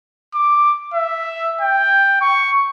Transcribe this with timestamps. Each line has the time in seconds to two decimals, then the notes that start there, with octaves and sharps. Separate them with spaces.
0.34 D6
0.94 E5
1.61 G5
2.21 C#6